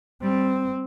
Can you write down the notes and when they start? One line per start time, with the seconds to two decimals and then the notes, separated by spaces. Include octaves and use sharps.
0.22 G3 C4